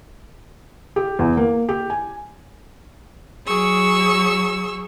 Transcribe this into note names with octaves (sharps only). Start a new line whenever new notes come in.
G4
E2
A#3
G4
G#5
F#3 G#4 C#6 E6